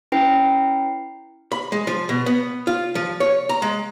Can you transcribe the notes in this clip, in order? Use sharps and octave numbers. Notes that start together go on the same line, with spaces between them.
C#4 E4 B4 G5 C7
B5
G#3
F3
B2
B3
F4
F3
C#5
A#5
G#3